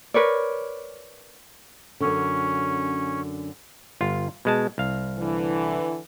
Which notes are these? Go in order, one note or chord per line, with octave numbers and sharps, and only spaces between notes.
A#4 B4 C#5 D5
F#2 D3 C#4
G1 F4
B2 G#3 A5
C2 F5
D3 E3